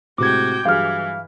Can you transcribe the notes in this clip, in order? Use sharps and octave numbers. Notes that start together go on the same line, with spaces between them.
A2 C3 G#3 F#4 G5 D6 G#6
G2 E3 F#3 G#4 F5 F6